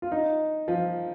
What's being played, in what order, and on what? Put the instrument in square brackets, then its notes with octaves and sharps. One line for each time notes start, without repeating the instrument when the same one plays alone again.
[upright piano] F4
D#4
F3